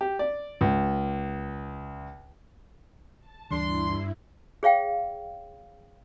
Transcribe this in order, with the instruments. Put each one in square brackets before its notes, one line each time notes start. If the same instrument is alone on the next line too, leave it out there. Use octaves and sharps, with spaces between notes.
[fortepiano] G4
D5
C#2
[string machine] A5
[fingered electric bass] D2 E3 G3 [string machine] G2 E4 [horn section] D4 C6
[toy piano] G#4 C#5 F5 G5